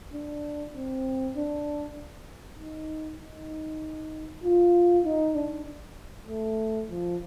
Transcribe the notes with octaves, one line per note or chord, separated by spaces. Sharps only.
D4
C4
D4
D#4
D#4
F4
D#4
D4
A3
F3